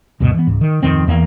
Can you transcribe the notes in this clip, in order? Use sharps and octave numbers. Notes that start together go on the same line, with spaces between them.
D2 G2 B2
E3 B3
C#2 G#2
D#3
D1 F2 D#3 C4
E2 E3 A#3